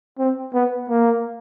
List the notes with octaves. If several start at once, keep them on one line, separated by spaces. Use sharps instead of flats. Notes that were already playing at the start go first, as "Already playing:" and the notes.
C4
B3
A#3